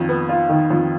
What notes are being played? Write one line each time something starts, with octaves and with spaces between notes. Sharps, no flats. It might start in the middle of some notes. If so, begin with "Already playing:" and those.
Already playing: F2 D#3
B3
F4
D#3
F2